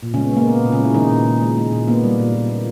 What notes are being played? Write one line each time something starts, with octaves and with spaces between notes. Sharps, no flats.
A#2
C#3 G#3 C#4
B3
G#3 A#3
A#2 B3
A#2
C#3 C#4
G#3
E4
D#3 G#3 D#4
A#2
A#2
G#3
G#3
A#2
A#3 B3
G3
A#2
A#2
A#3